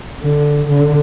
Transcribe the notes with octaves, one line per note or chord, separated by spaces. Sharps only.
D3
D3